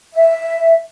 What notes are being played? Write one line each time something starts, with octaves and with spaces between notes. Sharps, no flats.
E5